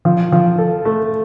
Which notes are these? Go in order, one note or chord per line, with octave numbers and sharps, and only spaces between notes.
F3
F3
A4
A3